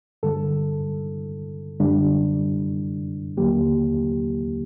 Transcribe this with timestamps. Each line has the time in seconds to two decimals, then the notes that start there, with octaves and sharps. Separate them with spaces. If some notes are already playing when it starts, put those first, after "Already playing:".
0.23 G2 D3 G3 A4
1.80 F#2 D3 G3 D4
3.37 D#2 D3 F#3 A#3 G4